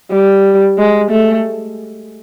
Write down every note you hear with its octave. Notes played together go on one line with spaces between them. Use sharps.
G3
G#3
A3